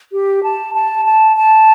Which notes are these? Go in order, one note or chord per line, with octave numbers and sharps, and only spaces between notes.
G4
A5
A5
A5
A5